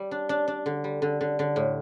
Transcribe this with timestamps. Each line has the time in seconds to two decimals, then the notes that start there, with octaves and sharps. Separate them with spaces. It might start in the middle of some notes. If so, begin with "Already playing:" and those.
Already playing: G3
0.11 D4
0.29 D4
0.48 D4
0.66 D3
0.84 G3
1.02 D3
1.21 D3
1.39 D3
1.56 A2